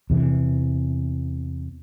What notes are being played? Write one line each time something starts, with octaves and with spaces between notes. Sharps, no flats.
E2 C3 E3